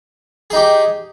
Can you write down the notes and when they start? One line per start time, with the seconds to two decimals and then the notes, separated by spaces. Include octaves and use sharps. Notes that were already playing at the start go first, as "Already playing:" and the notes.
0.50 G#4
0.53 D#4
0.56 G4